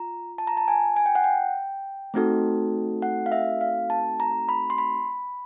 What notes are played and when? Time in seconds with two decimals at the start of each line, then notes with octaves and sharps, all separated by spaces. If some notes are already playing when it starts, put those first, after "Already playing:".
Already playing: F4 A#5
0.38 A5
0.47 A#5
0.57 A5
0.68 G#5
0.97 G#5
1.06 G5
1.15 F#5
1.24 G5
2.14 A3 C4 D#4 F#4 A4
3.02 F#5
3.26 F5
3.32 E5
3.61 F5
3.90 A5
4.20 A#5
4.49 B5
4.70 C6
4.78 B5